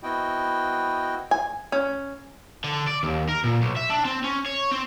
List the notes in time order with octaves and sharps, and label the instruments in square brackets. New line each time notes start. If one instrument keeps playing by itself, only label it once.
[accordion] B3 C4 E4 F#4 D#5 G5
[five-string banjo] G#5
C#4
[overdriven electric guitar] D3
D5
D#2
A#4
A#2
B1
E5
D4
C4
C#4
C#5
C4